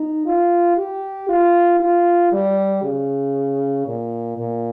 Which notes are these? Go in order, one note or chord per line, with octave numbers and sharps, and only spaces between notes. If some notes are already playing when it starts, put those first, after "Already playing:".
Already playing: D#4
F4
G4
F4
F4
G3
C#3
A#2
A#2